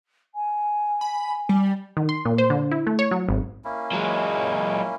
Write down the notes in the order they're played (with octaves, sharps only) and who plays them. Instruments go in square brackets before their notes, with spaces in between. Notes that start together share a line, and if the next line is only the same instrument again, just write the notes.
[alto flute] G#5
[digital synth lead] B5
G3
[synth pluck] D#3
C6
A#2
C5
D3
E4
A3
C#5
F#3
G#1
[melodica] A#3 C#4 E4
[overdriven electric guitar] F#3 G#3